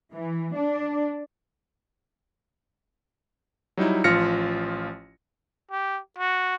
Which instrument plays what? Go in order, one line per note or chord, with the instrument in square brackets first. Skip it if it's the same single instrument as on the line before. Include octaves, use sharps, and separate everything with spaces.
[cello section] E3
D4
[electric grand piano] F#3 G3 D#4 E4
A1 F3 F4 F6 A#6 C#7
[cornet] G4
F#4